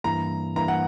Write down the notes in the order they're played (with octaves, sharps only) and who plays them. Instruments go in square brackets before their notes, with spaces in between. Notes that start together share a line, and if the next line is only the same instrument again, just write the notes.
[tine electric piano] G2 E3 A#3 E4 [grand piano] A#5
[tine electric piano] G2 E3 A#3 E4 [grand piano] A#5
[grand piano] F#5